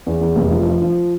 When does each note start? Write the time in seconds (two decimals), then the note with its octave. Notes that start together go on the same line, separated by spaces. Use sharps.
0.06 E2
0.21 E2
0.36 F1
0.51 F3
0.66 F3
0.81 F3